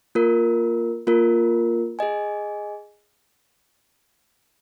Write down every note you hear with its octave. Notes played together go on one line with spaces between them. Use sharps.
A#3 F4 A#4
A#3 F4 A#4
G#4 D#5 G#5